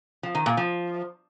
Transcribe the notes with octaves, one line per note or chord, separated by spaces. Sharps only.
F3
D#3
A#2
F3